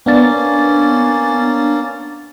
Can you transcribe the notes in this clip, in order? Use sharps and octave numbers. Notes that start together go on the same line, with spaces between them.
A#3 B3 C#4 D4 A6